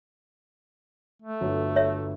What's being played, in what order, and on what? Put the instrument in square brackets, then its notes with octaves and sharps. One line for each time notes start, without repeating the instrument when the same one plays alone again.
[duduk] A3
[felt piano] G1 F#3
[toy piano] C#5 E5